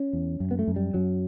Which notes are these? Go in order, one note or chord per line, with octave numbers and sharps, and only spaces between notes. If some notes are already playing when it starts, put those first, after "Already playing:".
Already playing: C#4
E2
F#2
B3
A3
F#2
G3
F#2 F#3